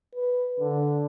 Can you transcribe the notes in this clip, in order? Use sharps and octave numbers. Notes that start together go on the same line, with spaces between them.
B4
D3